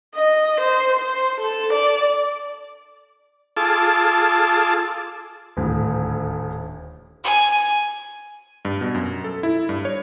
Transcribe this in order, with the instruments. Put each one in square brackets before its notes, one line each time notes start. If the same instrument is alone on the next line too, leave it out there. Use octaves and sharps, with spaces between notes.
[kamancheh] D#5
C5
C5
A4
D5
[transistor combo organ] F4 G#4 A4 A5 D6
[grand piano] D#1 D2 A2
[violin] G#5
[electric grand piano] G2
B2
F#2
A4
E4
G2
C#5